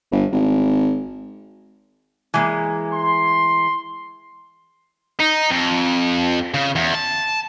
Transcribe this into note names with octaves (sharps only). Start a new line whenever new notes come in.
G1
G#1
E3 G#3 A#3
C6
D#4
F2
C#3
E2
A5